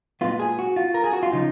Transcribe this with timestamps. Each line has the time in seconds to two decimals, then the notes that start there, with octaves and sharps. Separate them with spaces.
0.21 A#2 G#3 B3 F4
0.40 G#4
0.59 F#4
0.76 F4
0.94 A#4
1.04 G#4
1.13 F#4
1.23 F4
1.32 C#3 F3 D#4